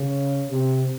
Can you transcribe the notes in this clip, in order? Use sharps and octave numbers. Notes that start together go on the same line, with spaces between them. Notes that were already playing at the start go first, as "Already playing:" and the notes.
Already playing: C#3
C3